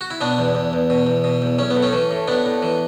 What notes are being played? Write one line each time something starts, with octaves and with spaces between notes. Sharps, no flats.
F#4
E4
B2 B3 D4
E2
E2
E2
B2
E2
B2
E2
B1 C#4
B3
A2
A3 C#4
E3
A2
A2 B3 D4
A2
E3